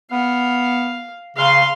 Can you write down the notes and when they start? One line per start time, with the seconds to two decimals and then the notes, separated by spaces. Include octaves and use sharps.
0.12 B3 F5
1.36 C#3 F5 C6